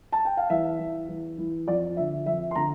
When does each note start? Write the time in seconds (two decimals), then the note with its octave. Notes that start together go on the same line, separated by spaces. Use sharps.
0.12 A5
0.25 G5
0.37 F5
0.50 E2 E5
0.79 E3
1.09 E2
1.38 E3
1.67 F2 D5
1.97 D3 F3 E5
2.26 F2 E5
2.51 C6
2.55 D3 F3 A#5